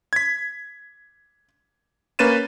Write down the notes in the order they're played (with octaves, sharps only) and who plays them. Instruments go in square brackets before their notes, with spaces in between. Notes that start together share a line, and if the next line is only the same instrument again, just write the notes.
[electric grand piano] G#6 B6
A#3 C#4 B4 A6 D#7 E7